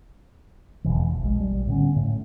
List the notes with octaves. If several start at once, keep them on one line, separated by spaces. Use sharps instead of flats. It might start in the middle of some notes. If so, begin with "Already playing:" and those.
E1 C2 B2 E3
A#1 G#3
G3
A2 D3 B3 C#4
A2